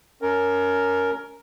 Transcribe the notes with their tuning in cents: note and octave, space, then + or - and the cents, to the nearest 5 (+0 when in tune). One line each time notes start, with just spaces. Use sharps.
C#4 +20 A#4 +0